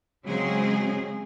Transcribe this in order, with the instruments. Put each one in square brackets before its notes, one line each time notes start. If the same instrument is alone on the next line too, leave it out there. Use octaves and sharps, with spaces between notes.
[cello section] C#3 F#3 G#3 C4 G#4